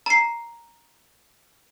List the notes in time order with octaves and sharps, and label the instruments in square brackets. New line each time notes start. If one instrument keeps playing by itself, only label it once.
[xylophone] A#5 C7